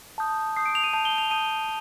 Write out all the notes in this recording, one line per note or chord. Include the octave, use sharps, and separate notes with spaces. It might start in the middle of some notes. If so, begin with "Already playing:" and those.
A5 D#6 G6
A5 D#6 G6 C7
D7
F7
D#7
A5 D#6 G6 F7
G7
F7
A5 D#6 G6 D#7